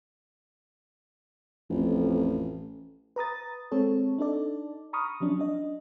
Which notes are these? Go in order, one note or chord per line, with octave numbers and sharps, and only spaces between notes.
A1 F2
B4 A#5 D#6 A6
G#3 C4 A4 C#5
D4 D#4 A4 D5
A#5 B5 C#6 D#6 F6
F3 F#3 C#4 D4
D4 D#5